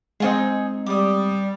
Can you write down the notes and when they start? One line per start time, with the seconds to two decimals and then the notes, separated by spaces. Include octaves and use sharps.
0.20 G#3 C4 D#4 F4 G#4
0.86 G3 D6 D#6